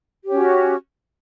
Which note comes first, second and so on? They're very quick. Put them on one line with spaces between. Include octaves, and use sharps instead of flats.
G4 C#5 C#4 F#4